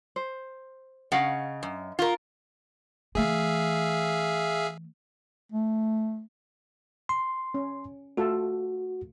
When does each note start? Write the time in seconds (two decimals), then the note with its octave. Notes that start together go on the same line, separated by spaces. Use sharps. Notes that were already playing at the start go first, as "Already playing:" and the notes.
0.16 C5
1.12 C#3 D#5 F5 F#5
1.63 F#2
1.99 F4 A#4
3.15 E3 A3 G#4 E5 F5
5.52 A3
7.09 C6
7.54 C#4
8.17 A3 F4 F#4 A4